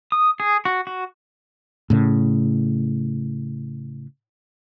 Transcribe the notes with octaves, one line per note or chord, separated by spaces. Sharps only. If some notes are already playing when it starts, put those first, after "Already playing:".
D#6
G#4
F#4
F#4
A2 C#3